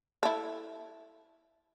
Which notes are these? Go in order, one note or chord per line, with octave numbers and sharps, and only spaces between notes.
E4 A4